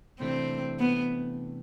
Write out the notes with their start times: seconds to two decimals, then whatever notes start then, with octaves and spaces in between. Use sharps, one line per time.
0.20 C3 E3 A3 C4 D4
0.80 B3